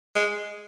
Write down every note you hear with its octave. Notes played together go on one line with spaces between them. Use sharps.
G#3